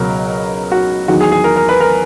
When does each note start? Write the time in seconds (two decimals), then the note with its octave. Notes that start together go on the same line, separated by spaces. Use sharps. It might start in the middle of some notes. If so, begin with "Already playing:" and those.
Already playing: C#2 B2 F#3 A#4
0.72 F#4
1.08 E2 D#3 F#3 F#4
1.21 G#4
1.32 G#4
1.44 A#4
1.56 A#4
1.69 B4
1.80 A#4